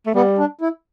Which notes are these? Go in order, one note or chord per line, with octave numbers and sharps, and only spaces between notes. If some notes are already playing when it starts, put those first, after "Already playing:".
A3
G3 B3
D4
E4